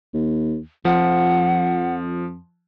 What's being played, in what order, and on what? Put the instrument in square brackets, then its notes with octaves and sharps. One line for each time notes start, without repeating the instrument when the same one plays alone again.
[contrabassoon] D#2
[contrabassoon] F2 [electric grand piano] F3 [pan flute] F#5